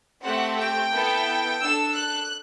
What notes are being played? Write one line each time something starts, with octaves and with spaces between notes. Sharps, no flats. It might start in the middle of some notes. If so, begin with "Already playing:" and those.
A3 C4 G4 F#5
G5
B3 E4 A4
D4 A4 E6
F#6